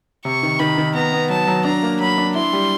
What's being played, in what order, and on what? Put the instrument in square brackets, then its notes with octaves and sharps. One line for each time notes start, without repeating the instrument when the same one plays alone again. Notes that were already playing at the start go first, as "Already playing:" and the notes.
[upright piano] C3 [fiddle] C#6
[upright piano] D#3
[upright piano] D#3 [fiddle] B5
[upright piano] D#3
[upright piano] B3 [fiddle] A#5
[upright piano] B3
[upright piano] F#3 [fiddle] A5
[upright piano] F#3
[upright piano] D4 [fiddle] A#5
[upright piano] A#3
[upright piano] F#3 [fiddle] B5
[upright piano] D4
[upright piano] E4 [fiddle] C6
[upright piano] G3